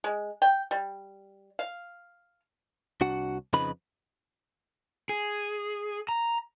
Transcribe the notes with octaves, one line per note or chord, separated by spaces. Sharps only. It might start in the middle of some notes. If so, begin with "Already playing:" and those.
G#3
G5
G3
F5
C2 D4 F#4 F#5
F2 C#3 F3 D#4 B4 B5
G#4
A#5